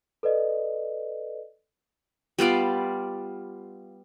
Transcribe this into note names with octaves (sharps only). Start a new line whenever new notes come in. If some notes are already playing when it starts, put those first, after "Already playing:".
A4 B4 D5 D#5
G3 B3 F4 D5